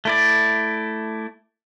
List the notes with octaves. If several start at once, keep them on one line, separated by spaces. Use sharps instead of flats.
A3 E4 D5